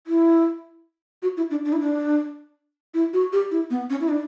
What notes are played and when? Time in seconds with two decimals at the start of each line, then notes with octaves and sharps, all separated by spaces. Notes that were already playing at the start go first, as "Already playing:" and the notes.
0.07 E4
1.23 F#4
1.37 E4
1.51 D4
1.65 D4
1.73 E4
1.81 D4
2.94 E4
3.13 F#4
3.33 G4
3.51 E4
3.70 B3
3.90 C#4
4.01 E4
4.09 D4